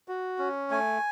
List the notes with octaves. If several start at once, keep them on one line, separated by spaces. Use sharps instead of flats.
F#4
C#4
A3 G#5